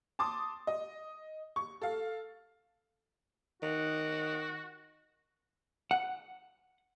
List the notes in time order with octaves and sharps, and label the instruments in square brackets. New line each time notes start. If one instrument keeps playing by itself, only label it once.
[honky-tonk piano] A5 C6 D6 D#6
D#5
C#6
A4 F5
[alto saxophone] D#3 [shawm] F#4
[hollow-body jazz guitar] F#5